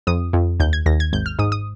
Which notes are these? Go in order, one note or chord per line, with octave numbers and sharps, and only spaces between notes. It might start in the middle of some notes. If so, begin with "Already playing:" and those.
F2 D#6
F2
D#2 G6
G#6
D#2 A#6
G#6
G#1 G6
F6
G#2 D#6
D#6